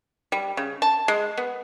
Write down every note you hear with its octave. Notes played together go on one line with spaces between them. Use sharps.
G3
C#3
A5
G#3
B3